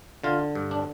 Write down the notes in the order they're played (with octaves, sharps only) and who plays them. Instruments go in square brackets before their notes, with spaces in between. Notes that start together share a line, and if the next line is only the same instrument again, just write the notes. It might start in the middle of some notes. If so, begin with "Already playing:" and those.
[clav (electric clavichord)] D3 F4
G2
D4